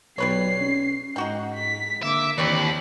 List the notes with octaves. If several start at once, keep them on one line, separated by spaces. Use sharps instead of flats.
B1 G3 B4 C#5 C7
C#4
G#2 D#4 F#4 F#5 G5
B6
D3 A#3 E5 D6
D#2 E3 C4 C#5 D5 B5